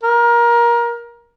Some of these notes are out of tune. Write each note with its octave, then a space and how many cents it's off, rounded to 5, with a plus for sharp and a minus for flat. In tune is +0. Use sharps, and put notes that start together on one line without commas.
A#4 +25